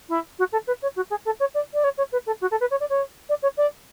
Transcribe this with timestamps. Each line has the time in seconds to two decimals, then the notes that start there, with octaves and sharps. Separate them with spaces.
0.09 E4
0.39 F#4
0.52 A4
0.67 B4
0.82 C#5
0.96 F#4
1.10 G#4
1.25 A4
1.40 C#5
1.54 D5
1.74 D5
1.84 C#5
1.97 C#5
2.12 B4
2.26 A4
2.41 F#4
2.51 A4
2.60 B4
2.71 C#5
2.80 D5
2.90 C#5
3.29 D5
3.42 C#5
3.57 D5